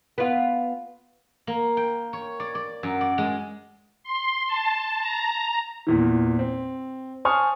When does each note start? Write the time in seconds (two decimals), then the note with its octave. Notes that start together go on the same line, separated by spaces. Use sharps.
0.18 B3 F4
1.47 A#3
1.77 G5
2.13 C#5
2.40 D5
2.55 D5
2.83 F#2
3.01 D5
3.18 G#3
4.04 C6
4.47 A5
5.00 A#5
5.87 E2 A#2 E3
6.39 C4
7.25 C5 G#5 A5 C#6 D#6 F6